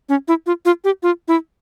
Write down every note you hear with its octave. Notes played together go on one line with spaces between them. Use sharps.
C#4
E4
F4
F4
G4
F4
E4